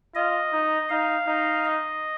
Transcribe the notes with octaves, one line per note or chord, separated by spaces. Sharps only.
F4 D#5
D#4
D#4 F5
D#4
D#5